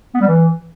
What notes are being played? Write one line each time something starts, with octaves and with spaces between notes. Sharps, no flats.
B3
G3
E3